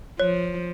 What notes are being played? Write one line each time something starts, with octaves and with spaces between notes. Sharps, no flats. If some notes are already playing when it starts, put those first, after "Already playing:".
F3 C#5